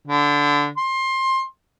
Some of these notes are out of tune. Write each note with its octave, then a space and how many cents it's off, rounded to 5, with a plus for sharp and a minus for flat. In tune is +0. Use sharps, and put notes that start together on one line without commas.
D3 -15
C6 +20